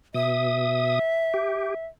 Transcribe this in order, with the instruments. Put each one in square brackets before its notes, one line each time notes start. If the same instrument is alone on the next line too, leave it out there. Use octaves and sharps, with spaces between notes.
[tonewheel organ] B2 D#6 [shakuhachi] E5
[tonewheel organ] G4